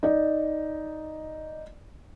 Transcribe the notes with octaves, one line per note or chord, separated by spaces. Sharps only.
D#4 D5